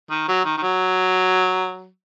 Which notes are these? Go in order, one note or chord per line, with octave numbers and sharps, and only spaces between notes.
D#3
F#3
D#3
D#3
F#3